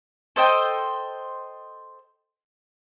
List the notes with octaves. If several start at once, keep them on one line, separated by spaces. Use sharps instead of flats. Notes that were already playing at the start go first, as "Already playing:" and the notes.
A4 C5 D#5 G5